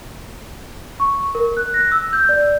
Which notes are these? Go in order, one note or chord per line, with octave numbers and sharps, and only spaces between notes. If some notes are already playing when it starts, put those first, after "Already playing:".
C#6
A#4
F#6
A#6
E6
G6
D5